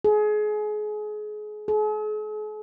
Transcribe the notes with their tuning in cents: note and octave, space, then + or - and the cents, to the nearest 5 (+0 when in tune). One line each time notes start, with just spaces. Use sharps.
G#4 +30
G#4 +45